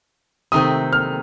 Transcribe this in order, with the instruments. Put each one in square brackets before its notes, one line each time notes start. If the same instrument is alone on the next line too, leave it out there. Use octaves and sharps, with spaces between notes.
[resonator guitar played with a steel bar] C3 D#3 A3 C4 [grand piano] D#6
[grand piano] F6